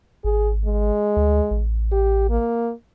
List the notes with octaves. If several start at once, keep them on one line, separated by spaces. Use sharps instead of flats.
G#1 G#4
G#3
D2
A1
G4
A#3